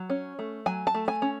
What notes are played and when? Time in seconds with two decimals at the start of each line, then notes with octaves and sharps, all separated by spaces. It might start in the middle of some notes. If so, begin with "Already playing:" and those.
Already playing: F#3
0.10 C#4
0.39 A3
0.66 F#3 G#5
0.87 A5
0.94 A3
1.08 G#5
1.22 C#4